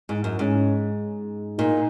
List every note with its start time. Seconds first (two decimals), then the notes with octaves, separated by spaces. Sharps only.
0.09 G#2
0.24 F#2
0.38 G#2 C#4
1.58 A#2 D#4